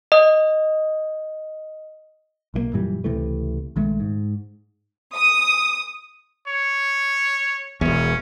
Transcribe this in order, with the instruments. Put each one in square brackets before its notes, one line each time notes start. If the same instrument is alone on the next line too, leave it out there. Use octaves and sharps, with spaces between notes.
[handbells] D#5 D#6
[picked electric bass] B1 E3 A#3
F#2 A#2 E3 G3
C#2 C3 E3 A3
A#1 D#3 G#3 A3
G#2
[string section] D#6
[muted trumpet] C#5
[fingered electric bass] E1 E2 [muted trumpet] C#4